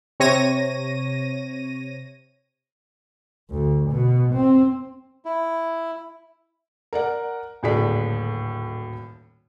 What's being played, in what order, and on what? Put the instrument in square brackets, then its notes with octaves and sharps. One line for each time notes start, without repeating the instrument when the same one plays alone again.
[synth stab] C3 C#5 A#6 D#7
[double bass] D2
B2
C4
[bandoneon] E4
[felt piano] A#4 D5 F#5
D#1 D2 A2 G#4 D5 B6